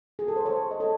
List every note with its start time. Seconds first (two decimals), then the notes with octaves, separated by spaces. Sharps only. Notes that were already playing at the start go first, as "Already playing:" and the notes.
0.19 G#4
0.28 A4
0.36 C5
0.45 A4 C#5
0.71 D#5
0.80 A4 C#5